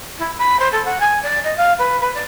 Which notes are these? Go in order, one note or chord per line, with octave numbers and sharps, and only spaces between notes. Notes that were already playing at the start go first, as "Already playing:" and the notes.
E4
B5
C5
A4
F#5
G#5
D5
D#5
F5
B4
B4
D5